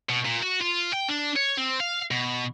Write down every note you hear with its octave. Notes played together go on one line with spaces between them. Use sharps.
B2
A#2
F#4
F4
G5
D4
C#5
C4
F5
B2